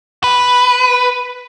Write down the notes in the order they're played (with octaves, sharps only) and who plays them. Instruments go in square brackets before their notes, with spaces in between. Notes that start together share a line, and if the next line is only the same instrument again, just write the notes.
[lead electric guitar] B4